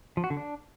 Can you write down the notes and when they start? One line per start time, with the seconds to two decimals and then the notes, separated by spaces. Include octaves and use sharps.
0.17 F3
0.24 F#4
0.30 D3
0.37 D4